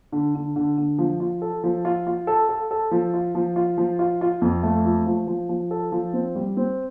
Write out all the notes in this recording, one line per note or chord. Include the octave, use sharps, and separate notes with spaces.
D3
D3
D3
D3
F3
F4
A4
F3
F4
F4
A4
A4
A4
F3
F4
F3
F4
F3
F4
F4
F2
A3
F3
F3
F3
F3
A4
F3
C4
G3
C4